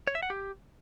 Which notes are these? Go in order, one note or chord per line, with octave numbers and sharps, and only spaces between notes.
C#5
E5
F#5
G4